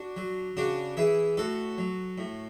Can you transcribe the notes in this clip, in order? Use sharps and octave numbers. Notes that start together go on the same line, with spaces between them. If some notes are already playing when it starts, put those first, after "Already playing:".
Already playing: D4 F#4
F#3
C#3 D4 F#4
E3 E4 G#4
A2 F#4 A4
F#3
A2